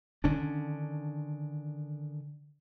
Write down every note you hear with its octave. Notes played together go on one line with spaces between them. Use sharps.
D3 D#3 C#4 D4